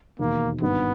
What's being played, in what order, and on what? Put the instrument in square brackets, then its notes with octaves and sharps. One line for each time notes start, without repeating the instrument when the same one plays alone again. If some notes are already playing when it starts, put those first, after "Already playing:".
[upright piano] E1 D#2 D#3 [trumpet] A#3
[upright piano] G#1 G2 D#3 G3 [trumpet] B3